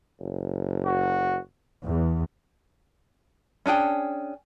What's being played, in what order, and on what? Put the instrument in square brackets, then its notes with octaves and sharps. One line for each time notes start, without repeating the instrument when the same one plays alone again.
[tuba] F#1
[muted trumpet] F#4
[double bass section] E2
[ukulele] C#4 D4 G#4 G5